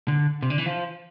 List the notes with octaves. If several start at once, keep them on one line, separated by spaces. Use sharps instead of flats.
D3
C3
D3
E3
F3